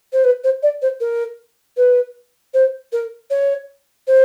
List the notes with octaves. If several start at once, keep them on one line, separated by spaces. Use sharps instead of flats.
C5
B4
C5
D5
C5
A#4
B4
C5
A#4
C#5
C5